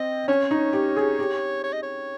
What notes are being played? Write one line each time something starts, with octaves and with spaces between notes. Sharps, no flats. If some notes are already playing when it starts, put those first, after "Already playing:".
Already playing: C4 D#5
C#4 C#5
D#4
G4
G#4
G4
C#5
D#5
C#5